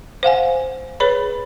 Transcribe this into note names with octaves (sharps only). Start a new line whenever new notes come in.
C5 F5 F#5 G#5
G#4 B4 C#5 B5